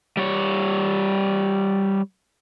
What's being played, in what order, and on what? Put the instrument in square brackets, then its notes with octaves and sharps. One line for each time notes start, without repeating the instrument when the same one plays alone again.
[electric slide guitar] G3 C#5